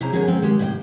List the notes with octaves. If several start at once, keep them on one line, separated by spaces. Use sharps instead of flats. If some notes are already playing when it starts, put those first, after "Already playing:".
C3 C#4 E4 G#4 C5 A#5
D3 F3 C#4 G#4 A#4 D#5
F3 G#3 B3 C4
D#3 G#3 G4
A2 C3 C5 D#5 G5